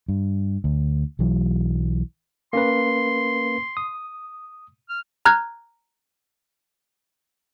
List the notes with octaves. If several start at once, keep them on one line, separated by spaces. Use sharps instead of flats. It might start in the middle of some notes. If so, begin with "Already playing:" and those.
G2
D2
B1 E3 F#3
A#3 C#4 B4 C6
D#6
F6
A#5 F6 F#6 G#6